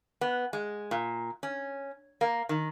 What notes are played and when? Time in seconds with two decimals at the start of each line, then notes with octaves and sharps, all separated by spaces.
0.21 B3
0.53 G#3
0.91 A#2
1.43 C#4
2.21 A#3
2.49 D#3